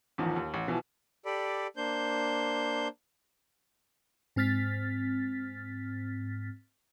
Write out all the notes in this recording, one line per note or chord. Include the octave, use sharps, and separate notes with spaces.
A1 E2 D#3 F3
D#2
A1
B2 E3 F3
G4 A4 D5 B5
A#3 D4 C5 G6
G#2 C4 F6 A6 B6